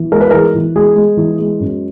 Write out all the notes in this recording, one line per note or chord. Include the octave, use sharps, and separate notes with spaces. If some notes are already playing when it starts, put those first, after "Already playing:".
Already playing: E3
G#3 A#4
B4
E3 G#4 A#4
E3
G#3 G#4
G#3
E3
G#3
F#2